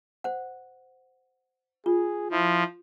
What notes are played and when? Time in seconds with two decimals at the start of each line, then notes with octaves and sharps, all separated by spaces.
0.24 C5 F#5
1.86 F4 G#4
2.31 F3 E4